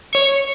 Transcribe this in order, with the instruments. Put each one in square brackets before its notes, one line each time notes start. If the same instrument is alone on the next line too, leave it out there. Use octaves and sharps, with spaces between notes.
[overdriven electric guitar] C#5